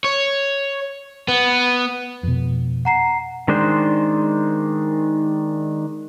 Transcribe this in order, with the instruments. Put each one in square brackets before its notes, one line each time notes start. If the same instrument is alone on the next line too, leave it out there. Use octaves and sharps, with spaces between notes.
[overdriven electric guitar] C#5
B3
[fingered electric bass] F2 B2
[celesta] F#5 A#5 C7
[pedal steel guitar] D#3 G#3 D4 C5